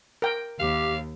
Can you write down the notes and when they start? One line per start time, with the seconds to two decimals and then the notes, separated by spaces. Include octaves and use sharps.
0.22 A#4 G5
0.59 D#2 G4 F5